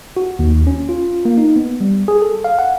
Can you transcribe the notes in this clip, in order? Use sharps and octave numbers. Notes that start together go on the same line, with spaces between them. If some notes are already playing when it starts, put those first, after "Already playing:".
F#4
D#2
C#4
F4
A#3
D#4
B3
G3
G#4
A4
F5
F#5